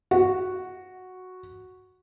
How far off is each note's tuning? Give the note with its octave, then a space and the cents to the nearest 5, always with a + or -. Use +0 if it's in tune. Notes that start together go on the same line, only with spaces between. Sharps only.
F#4 -5